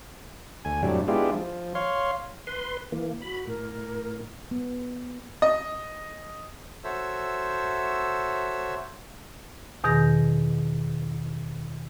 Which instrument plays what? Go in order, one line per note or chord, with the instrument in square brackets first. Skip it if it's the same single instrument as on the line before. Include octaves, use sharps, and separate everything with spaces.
[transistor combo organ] D2 G#5
F2 A2 F#3 G3 D4
G#3 B3 D4 E4 F4 G4
F3
C#5 F5 C6
[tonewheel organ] B4 C6
E3 A#3
[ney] F#4 [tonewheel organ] B5
[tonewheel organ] A2 [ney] A#4
[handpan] B3
[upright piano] D#5
[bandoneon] F#4 A4 C5 C#5 E5 E6
[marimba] E2 B2 D#3 G#4 G6 A#6